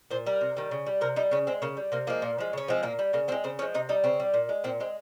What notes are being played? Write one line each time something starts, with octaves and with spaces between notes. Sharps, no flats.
A#2 C5
G3 A#4
C3
D#3 G3
C#3
G3
C3 A#4
G3 D#4
C#3 C#4
G#3 C4
C#3 A#3
G3
C3 A#3
F3 G#3 A#3
A#2
F3 G#3
C#3 C#4
F3 G#3 C4
A#2 A#3
G3
C#3 A#3
F3 C4
G#3
C#3 C4
F3 G#3 C#4
C3 D#4
G3 D#4
C#3 C4
G3
A#2
G#3
A#2 C4
G#3 C4